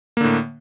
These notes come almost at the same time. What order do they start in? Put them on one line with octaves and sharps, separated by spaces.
A#3 D3 A2